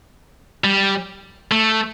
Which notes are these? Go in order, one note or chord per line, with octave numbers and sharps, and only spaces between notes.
G3
A3